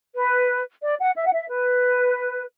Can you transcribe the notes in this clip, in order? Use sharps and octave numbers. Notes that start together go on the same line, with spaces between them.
B4
D5
F#5
E5
F#5
E5
B4